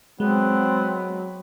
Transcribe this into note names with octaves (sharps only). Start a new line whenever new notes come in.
F#3 G#3 B3 C4